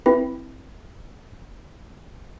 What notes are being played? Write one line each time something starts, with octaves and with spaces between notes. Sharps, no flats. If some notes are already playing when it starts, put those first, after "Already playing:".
C4 E4 B4